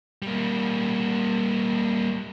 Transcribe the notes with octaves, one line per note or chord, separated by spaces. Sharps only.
G3 A#3